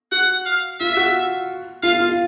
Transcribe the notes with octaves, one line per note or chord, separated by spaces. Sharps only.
F#4 F#5
F5
F4 E5
F#4
F4 F5
F4